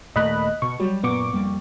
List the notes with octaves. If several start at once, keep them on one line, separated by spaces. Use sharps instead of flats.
D#2 A#2 A3 D#5 B5 F#6
B2 C#6
F#3 G3
F#2 A#2 B3 C#6 D6
F2 G3 A#3